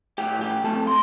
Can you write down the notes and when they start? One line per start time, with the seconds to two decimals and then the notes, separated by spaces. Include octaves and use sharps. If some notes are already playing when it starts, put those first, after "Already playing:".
0.18 A2 G4 G5
0.41 G4 G5
0.64 A3 C4 A4 A5
0.87 C6